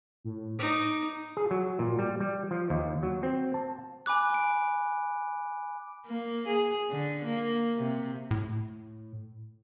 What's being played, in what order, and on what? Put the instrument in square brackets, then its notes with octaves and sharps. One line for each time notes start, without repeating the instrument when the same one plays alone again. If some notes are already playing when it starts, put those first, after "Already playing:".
[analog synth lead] A2
[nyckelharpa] D#4 [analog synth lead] D6
[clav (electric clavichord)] G#4
F#3
A#2
G3
G3
F3
D#2
F#3
C4
A5
[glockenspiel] G#5 B5 D6 F#6
G#5 D7
[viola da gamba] A#3
G#4
D3
A#3
C3
[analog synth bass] A2